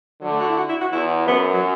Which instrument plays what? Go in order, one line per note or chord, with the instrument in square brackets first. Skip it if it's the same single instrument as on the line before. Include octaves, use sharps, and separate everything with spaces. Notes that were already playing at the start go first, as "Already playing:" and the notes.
[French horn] D3 [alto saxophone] F#3
[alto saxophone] A3
F#4
E4
F#4
E4
F#4
[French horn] E2 [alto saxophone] E4
[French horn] F#2 [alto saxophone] B3
[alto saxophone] F#3